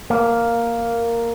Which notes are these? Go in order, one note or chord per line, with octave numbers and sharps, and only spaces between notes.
A#3